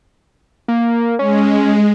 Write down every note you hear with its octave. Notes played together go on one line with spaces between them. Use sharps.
A#3
G#3 C#4